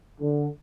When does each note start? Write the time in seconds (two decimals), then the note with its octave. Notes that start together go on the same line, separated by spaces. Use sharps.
0.21 D3